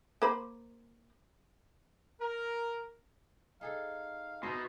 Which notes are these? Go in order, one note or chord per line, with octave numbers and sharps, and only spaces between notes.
A#3 C5 B5
A#4
D#4 G#4 A4 F5
B2 D#4 E4 C6